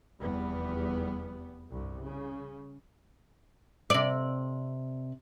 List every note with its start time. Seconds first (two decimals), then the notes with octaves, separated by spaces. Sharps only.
0.19 F1 E2 G3 B3
1.72 C2 G2
2.03 C#3
3.90 C3 D5